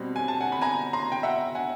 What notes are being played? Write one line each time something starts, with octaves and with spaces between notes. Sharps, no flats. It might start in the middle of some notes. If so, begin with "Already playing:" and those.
Already playing: B2 G3 C4
G#5
A5
F#5 G#5
B5
G#5 A#5
A#5 C6
G5
E5 F#5
F#5 G#5